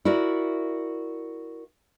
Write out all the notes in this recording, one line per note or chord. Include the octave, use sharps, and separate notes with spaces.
E4 F#4 A#4 D5